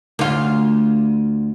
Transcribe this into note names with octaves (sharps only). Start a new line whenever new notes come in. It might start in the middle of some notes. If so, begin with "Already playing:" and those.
D2 F4